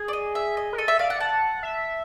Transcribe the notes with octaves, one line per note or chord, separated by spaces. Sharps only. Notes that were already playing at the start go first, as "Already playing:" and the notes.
Already playing: G#4
D5
D#5
E5
D#5
A#4
A4 D#5
E5
D5 F5
F#5
F#5 A5
E5